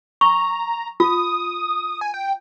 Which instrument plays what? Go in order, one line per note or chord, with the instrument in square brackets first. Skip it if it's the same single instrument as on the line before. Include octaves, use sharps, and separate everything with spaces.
[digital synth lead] A#5 [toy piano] C#6
[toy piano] F4 [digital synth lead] D#6
[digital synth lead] G#5
G5